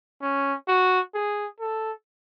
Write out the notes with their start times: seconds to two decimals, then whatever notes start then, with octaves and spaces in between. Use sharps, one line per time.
0.22 C#4
0.68 F#4
1.14 G#4
1.60 A4